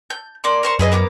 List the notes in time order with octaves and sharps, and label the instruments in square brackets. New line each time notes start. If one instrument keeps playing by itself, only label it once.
[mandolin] G6
A#3 D5 C6
A#4 C5 C#6
[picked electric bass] F#2 [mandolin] G#4 B4 D#5
[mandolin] A#3 B3 D6